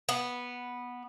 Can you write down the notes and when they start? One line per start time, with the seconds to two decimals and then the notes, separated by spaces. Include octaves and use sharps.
0.09 B3